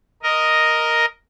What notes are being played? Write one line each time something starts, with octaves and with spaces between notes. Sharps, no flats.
A#4 D#5